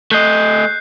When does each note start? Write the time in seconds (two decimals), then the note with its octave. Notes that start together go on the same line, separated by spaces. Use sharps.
0.11 A3 D#5 F#6 G6 C7